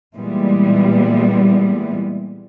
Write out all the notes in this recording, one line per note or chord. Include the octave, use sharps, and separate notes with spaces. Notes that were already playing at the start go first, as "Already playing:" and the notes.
A#2 E3 G3 G#3 B3